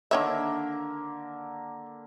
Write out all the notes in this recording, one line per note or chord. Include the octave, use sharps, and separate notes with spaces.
D3 D#3 A#3 C#5 E5